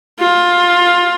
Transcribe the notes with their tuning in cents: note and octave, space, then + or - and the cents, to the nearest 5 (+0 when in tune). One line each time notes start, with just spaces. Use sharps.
F4 +15